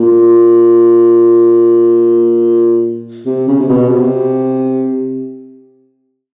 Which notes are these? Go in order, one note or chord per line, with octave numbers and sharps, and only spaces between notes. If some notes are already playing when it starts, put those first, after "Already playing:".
Already playing: A#2
C3
C#3
C3
B2
C3